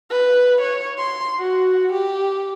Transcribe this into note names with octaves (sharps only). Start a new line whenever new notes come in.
B4
C#5
C6
F#4
G4